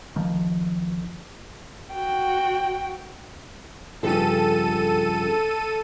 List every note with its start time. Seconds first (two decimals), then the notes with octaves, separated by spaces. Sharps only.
0.16 A1 D#3 F3
1.94 F#4 G5
4.03 G2 C#3 F3 A4 D#7